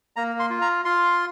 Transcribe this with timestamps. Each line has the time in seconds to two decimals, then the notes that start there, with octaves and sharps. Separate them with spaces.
0.16 A#3 A#5
0.39 C6
0.50 F4
0.61 A#5
0.85 F4 C6